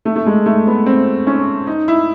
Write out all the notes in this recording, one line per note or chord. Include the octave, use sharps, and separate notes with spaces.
A3
A3
G#3
A3
B3
C4
C#4
D#4
E4